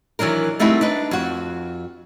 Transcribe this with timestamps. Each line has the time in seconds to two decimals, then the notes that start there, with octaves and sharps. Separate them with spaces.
0.19 D#3 E3 F#3 D4 A#4
0.59 G3 A3 C4 D#4 E4 F#4
0.81 D4 D#4 B4
1.11 F2 F#4